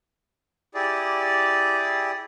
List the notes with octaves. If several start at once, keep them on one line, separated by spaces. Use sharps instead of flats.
E4 G4 G#4 D5